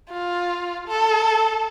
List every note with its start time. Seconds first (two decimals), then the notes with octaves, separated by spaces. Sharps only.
0.11 F4
0.88 A4